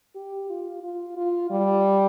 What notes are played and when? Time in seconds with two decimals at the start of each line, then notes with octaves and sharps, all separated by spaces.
0.15 G4
0.49 F4
0.83 F4
1.17 F4
1.50 G3